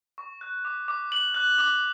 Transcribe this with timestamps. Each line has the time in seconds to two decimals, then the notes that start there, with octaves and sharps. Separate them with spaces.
0.18 C#6
0.41 F#6
0.65 D6
0.88 D6
1.12 F#6 F#7
1.34 F#6
1.58 D6